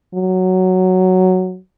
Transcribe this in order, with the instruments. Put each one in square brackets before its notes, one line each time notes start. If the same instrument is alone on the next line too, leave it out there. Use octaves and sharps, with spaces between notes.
[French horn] F#3